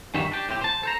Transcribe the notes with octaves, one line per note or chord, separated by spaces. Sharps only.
G2 D#3 G3 F#4 E5
D4 G4
A2 C4 G4
C5 A5
A4 C5 A#5